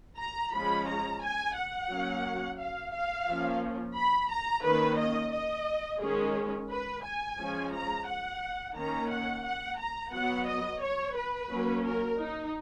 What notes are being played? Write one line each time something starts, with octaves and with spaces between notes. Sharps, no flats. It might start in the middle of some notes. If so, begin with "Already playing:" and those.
A#5
F3 G#3 C#4 B5
A#5
G#5
F#5
F#3 A#3 C#4
F5
F5
F3 A#3 C#4
B5
A#5
D#3 A#3 C#4 B4
D#5
D#5
D#3 G#3 C#4 G#4
B4
G#5
F3 G#3 C#4
A#5
F#5
D#3 A#3 C#4 A#5
F#5
F#5
A#5
F#3 B3 F#5
D#5
C#5
B4
F#3 A#3 C#4
A#4
D#4